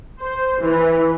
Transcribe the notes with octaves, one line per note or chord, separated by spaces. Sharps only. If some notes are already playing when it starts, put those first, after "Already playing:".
C5
E3